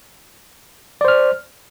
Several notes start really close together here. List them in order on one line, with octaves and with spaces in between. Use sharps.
D5 C5 F6